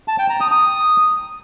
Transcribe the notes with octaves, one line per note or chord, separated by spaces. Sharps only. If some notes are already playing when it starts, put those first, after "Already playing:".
A5
G5
A#5
D#6
D#6